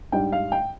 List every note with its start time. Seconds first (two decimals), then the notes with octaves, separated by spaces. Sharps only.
0.12 G#2 G3 D4 G5
0.32 F5
0.52 G5